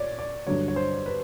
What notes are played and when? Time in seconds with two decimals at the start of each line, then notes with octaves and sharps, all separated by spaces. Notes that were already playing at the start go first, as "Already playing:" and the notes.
Already playing: A#2 C#5 D5
0.19 D5
0.47 G2 D3 F#3 C#5
0.68 C#5
0.76 C5
1.06 B4